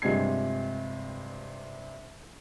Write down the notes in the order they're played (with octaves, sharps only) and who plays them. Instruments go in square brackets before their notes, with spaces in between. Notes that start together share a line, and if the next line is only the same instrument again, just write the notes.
[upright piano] G2 C3 F3 G#3 G#6 C7